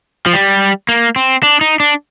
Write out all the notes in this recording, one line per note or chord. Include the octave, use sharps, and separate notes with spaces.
F3
G3
A#3
C4
D4
D#4
D4